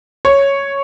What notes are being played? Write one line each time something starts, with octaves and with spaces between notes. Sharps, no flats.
C#5